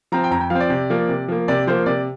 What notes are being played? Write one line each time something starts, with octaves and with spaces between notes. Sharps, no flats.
F3 C4 A#5
G5
F2 A#5
G5
F3 C4 F5
D5
C3
F3 A#3
C3
F3 A#3
C3 D5
F3 A#3 C5
C3 D5